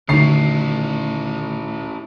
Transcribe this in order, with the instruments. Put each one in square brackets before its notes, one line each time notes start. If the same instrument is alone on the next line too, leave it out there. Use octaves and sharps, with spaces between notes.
[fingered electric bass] D#1 A2 D#3 [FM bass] D3 [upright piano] F#3 C7 [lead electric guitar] C#4 E4